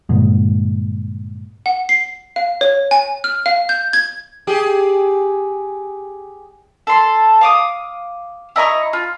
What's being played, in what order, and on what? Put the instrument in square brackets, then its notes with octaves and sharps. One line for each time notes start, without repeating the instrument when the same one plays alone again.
[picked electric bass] G2 A#2 D3 G#3
[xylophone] F#5
C7
F5
C#5
G#5
F6
F5
G6
G#6
[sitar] G4 G#4
[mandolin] A4 C6
F5 D6 D#6
E4 D#5 A#5 C#6
F4